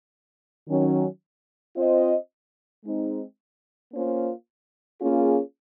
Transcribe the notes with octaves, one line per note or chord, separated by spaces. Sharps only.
D#3 F#3 C#4
C4 F4 C5 D#5
G#3 C4 D#4
A#3 C#4 F4 C5
A#3 C#4 F4 G#4